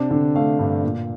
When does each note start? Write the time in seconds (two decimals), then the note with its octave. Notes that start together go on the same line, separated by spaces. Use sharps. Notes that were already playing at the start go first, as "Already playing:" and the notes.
Already playing: C3 D4
0.11 D3
0.36 A3 F5
0.59 G2
0.83 A#2